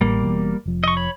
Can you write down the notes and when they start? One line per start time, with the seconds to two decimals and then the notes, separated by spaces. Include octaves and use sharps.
0.01 A1 A2 G3 A#3
0.22 E1 E2 B2
0.66 F1 F3
0.84 D#5 C#6
0.97 C#5 B5